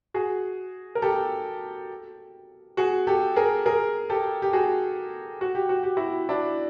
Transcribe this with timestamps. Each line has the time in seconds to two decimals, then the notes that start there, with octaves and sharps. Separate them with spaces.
0.14 F#4 G#4
0.95 A#4
1.02 G4 A4
2.77 F#4 G#4
3.07 G4 A4
3.36 G#4 A#4
3.66 G#4 A#4
4.10 G4 A4
4.42 G4
4.53 F#4 G#4
5.41 F#4
5.55 G4
5.69 F#4
5.83 G4
5.97 E4 F#4
6.29 D4 E4